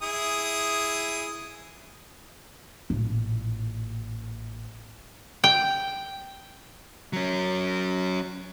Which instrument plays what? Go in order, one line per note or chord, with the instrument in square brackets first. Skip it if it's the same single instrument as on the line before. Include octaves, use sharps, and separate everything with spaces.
[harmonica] E4 G#4 D#6
[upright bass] A1 A#2
[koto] G5
[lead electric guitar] F#3 C#4